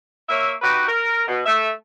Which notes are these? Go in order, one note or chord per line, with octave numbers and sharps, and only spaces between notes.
A#3 C#5 E5
D#4 F#4 G4 B4
A#4
B2
A3 E5